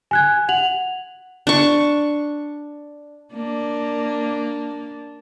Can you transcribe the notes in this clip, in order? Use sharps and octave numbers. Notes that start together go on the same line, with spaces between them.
G#5 F#6 G#6
F#5 F7 F#7
D4 C#6
A#3 D4